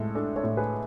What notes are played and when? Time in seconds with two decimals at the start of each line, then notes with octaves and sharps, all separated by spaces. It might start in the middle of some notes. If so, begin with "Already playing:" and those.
Already playing: A2 G#3 A4
0.15 D4 A4
0.36 A4 C#5
0.43 A2
0.57 G#4 B4